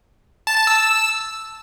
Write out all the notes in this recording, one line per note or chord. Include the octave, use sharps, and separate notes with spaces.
A5
A5
E6